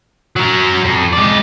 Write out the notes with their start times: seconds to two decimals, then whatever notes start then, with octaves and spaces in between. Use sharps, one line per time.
0.36 F#3 A#4
0.85 F2
1.13 G#3 D5